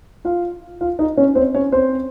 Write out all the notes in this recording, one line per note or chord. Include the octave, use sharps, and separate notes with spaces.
F4 F5
F4 F5
D#4 D#5
C#4 C#5
C4 C5
C#4 C#5
C4 C5